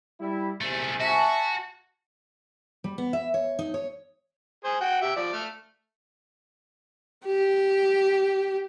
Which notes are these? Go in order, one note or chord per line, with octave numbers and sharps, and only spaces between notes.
G3 E4
C2 G#2 C3 A3 G#4
F#4 E5 G#5 A5 C#6
G3
B3
E5
C#5
D#4
C#5
G#4 C5
F#4 F#5 G5
G4 E5
F3 D5
A3 F6
G4